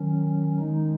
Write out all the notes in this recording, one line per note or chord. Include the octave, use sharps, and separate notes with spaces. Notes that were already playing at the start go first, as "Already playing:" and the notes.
Already playing: D#3 F#3 C#4
D#3 G#3 D#4